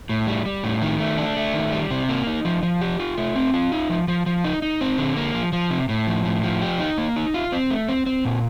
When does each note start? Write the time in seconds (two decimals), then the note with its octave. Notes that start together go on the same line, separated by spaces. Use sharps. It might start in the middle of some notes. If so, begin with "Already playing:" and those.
0.09 A2
0.27 G3
0.46 G3
0.64 A2
0.82 D#3
1.00 A3
1.18 D4
1.36 A3
1.54 D#3
1.72 G3
1.91 C3
2.09 A#3
2.27 D#4
2.45 F3
2.63 F3
2.81 G4
2.99 F4
3.17 A3
3.36 C4
3.54 F4
3.72 D#4
3.90 F3
4.08 F3
4.26 F3
4.44 D#4
4.62 D#4
4.81 C4
4.98 D3
5.17 A#3
5.34 F3
5.53 F3
5.71 C3
5.89 A2
6.07 F3
6.25 A2
6.43 F3
6.62 G4
6.79 D#4
6.98 A#3
7.16 D#4
7.34 F4
7.52 C4
7.70 A3
7.89 C4
8.06 C4
8.25 A#2